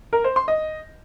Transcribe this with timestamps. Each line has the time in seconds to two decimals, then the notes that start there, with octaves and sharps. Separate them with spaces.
0.13 A#4
0.24 C5
0.36 C6
0.48 D#5